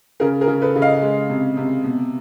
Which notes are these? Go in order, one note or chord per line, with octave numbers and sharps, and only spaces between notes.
C#3 G#4 A#4
G#4 A#4
C#3
A4 B4
C#3
D#5 F5
G#3
C3
C3
B2